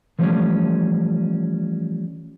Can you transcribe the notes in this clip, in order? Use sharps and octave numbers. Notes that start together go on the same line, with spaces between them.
E3 F3 G3 A3 C#4